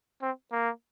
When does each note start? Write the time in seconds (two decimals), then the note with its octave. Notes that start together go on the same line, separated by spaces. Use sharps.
0.22 C4
0.52 A#3